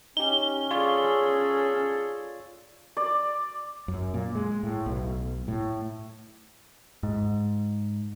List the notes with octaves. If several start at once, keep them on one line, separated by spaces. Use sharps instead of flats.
C#4 D#4 G4 G7
F4 G#4 A4 C#5 D5
D5
F#2
A#2
G#3
A2
B1
A2
G#2